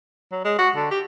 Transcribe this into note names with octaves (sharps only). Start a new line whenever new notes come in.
F#3
G#3
F#4
D3
G4